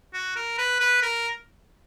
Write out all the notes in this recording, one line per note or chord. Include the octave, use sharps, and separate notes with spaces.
F#4
A#4
B4
B4
A#4